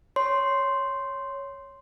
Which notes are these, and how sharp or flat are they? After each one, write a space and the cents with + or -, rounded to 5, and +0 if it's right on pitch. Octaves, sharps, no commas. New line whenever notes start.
C#5 +0 C6 +0